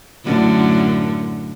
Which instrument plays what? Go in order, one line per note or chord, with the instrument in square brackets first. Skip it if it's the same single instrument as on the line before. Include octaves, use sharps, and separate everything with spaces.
[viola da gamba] F#2 A2 D3